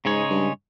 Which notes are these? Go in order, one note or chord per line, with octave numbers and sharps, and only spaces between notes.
G#2 C#3 G#3 D#4 G#4 C#5
G2